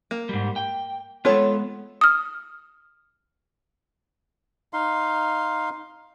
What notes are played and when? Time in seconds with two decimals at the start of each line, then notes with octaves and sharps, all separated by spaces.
0.11 A#3
0.29 G#2 G3
0.56 G5
1.25 G#3 B3 F4 A4 C#5
2.01 D#6 F6
4.73 D#4 F5 C6